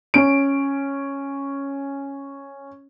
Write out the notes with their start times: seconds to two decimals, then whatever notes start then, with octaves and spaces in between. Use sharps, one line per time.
0.14 C#4 D7